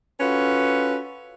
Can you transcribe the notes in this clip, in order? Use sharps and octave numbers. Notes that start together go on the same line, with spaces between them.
C#4 F4 F#4 A4 B4